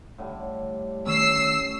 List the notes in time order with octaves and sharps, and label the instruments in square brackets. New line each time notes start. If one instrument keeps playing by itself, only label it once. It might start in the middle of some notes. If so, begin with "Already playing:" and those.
[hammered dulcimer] A2 D3 G3
[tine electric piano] D#3 A3 [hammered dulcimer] C#4 [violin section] E6 C7